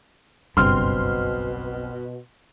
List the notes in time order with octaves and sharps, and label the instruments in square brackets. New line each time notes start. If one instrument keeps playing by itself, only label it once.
[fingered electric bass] F#1 G2 [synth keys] B1 C4 [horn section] B2 [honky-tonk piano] C6 F6